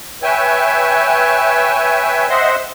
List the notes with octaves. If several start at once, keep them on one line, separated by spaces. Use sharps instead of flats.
B4 C#5 E5 G5 G#5
C5 D#5 E5 F#5 C6